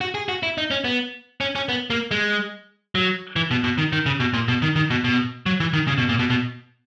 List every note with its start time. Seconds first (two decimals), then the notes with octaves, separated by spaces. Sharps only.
0.01 F#4
0.15 G#4
0.29 F#4
0.43 E4
0.58 D#4
0.71 C#4
0.84 B3
1.41 C#4
1.55 C#4
1.69 B3
1.90 A#3
2.11 G#3
2.95 F#3
3.36 E3
3.51 B2
3.64 B2
3.78 D#3
3.93 D#3
4.06 C#3
4.20 B2
4.34 A#2
4.48 B2
4.62 D#3
4.76 D#3
4.90 B2
5.04 B2
5.46 F#3
5.60 E3
5.73 D#3
5.88 C#3
5.98 B2
6.09 A#2
6.19 B2
6.30 B2